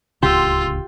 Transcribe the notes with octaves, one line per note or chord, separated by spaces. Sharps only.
D1 C#2 C#3 F4 G4 C6 E6